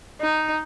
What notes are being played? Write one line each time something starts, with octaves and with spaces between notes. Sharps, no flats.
D#4